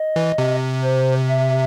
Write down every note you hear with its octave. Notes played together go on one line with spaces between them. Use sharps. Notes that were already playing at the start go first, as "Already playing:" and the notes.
Already playing: D#5
E3
C3
C5
E5